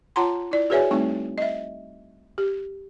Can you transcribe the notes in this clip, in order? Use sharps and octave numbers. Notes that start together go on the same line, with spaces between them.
F4 C#5 F#5 A5 A#5 C6
E4 D5
F#4 G#4 B4 C#5 E5 G#5
G3 A3 C4 D#4 C#6
D#5 E5
G4